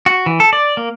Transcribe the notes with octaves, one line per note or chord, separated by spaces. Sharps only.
F#4
E3
A4
D5
A#3